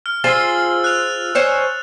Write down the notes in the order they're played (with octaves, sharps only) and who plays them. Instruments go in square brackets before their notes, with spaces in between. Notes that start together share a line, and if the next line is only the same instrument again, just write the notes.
[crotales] F6
[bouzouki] F4 G#4 C5 [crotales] E6 A6
[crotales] F#6 F7
[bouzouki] C5 C#5 G#5